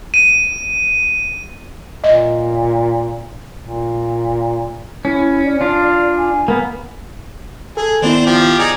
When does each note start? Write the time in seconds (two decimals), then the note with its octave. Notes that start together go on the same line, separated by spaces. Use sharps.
0.14 D#7
2.04 A#2 D#5
3.64 A#2
5.05 C#4 E4
5.44 D5
5.61 D4 F4
6.18 G#5
6.48 A#3 B3
7.77 G#4 A4
8.02 D#3 B3 C4 D4 E4
8.26 F3 G4
8.59 D#4 G#4 D5